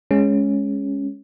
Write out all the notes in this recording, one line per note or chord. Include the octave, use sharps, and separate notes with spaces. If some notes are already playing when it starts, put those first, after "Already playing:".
G#3 C#4